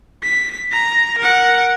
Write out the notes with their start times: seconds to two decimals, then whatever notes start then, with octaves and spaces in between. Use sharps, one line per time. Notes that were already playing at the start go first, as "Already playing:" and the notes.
0.23 B6
0.72 A#5
1.18 A#4 F#5